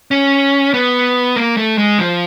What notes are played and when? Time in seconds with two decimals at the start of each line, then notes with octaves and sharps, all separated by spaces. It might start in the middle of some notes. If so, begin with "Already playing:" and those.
0.11 C#4
0.74 B3
1.36 A#3
1.57 A3
1.78 G#3
1.99 F3